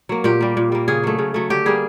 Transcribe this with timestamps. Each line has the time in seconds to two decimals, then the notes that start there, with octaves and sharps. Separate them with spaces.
0.09 F#3 A#3
0.24 A#2 G4
0.41 G3 A#3
0.57 A#2
0.72 G3 A#3
0.88 C#3 G#4
1.03 F#3 A3
1.18 C#3
1.34 F#3 A3
1.50 D3 G4
1.66 G3 A#3 G#4